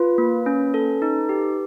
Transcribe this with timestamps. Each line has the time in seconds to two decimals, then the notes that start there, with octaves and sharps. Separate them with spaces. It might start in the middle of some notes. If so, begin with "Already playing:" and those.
Already playing: F4 B4
0.18 A#3
0.46 C#4
0.74 A4
1.02 D#4
1.29 G4